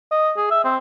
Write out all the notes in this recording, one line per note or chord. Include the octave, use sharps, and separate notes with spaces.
D#5
G#4
E5
C4